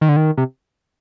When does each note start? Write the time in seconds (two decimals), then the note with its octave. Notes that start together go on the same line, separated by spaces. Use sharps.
0.01 D#3
0.09 D3
0.16 D#3
0.37 C3